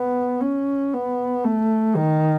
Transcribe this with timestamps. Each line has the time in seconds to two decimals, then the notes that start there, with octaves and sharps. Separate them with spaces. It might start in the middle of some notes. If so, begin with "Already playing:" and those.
Already playing: B3
0.41 C#4
0.94 B3
1.45 A3
1.97 D#3